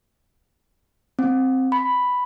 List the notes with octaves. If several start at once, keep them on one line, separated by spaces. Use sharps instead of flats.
C4
B5